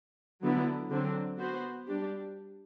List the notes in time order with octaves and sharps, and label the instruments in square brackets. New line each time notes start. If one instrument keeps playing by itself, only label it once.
[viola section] D3 F#3 B3 E4
D3 F#3 C4
B3 F#4 C5
G3 D4 G4